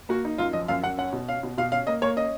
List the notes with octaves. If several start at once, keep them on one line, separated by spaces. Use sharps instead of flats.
A#3 F#4
D#4
F#2 F4
F3 D#5
F#2 F5
F#2 F#5
C#4 F#5
B2
C#4 F5
B2
B2 F5
C#4 F5
A#3 D#5
A#3 C#5
C#4 D#5